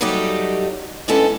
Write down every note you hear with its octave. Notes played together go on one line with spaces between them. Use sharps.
F#3 G3 A3 D#4 F#4 G4
G#3 B3 C#4 D4 E4 A4